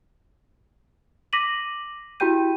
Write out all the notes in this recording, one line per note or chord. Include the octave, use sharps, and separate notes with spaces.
D6 A#6 B6 D#7 F#7
E4 F#4 G4 G5 G6 D#7